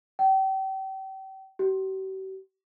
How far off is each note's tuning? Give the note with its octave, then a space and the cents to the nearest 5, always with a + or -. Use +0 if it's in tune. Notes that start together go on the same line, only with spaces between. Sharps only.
G5 -35
G4 -45